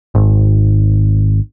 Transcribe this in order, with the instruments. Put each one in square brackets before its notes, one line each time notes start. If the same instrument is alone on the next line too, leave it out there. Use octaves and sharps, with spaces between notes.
[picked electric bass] G#1